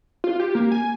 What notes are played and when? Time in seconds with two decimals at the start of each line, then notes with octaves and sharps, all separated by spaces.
0.24 F4
0.40 G4
0.55 A#3
0.72 G#5